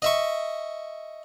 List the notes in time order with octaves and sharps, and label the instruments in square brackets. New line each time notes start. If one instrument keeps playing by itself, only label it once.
[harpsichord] D#5 E5 C#6